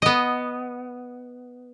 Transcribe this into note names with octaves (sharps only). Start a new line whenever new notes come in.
B3 D#5